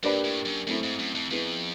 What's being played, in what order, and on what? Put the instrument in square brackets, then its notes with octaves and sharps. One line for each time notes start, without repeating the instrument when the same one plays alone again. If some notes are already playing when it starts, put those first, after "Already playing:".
[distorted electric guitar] G2 [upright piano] A#3 D4 G4 B4 D5
[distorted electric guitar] A2
F#2
[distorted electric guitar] F#2 [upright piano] A3 C4 E4
[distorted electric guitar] G#2
F#2
F2
[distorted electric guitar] F2 [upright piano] B3 E4 G#4 B4